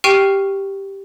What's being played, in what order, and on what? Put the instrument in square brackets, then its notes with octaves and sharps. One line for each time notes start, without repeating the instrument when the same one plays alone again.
[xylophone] G4 G5 C#6 F6 C7 D#7